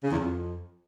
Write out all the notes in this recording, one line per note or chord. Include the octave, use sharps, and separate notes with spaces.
C#3
E2
F2